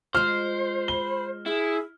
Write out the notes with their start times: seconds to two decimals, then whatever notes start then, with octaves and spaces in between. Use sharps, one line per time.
0.15 G#3 F4 C5 F6
0.88 B5 G7
1.46 E4 G#4